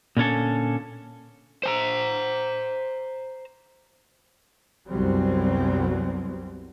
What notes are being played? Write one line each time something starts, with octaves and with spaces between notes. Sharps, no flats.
A#2 D3 C#4 A4
C5 G#5 A#5
C2 F#2 F#3 G3 B3 C4